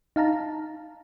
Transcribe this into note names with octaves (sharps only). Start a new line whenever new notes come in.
D#4 F5 A5 A#5